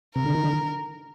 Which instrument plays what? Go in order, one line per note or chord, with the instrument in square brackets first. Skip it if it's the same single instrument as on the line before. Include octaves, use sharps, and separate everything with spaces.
[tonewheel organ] C3 [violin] A#4
[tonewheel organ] D3
D#3
D3